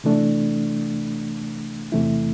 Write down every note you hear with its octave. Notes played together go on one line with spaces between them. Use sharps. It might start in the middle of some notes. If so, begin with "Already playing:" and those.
C3 E3 A3 D4
E2 C3 E3 A3 E4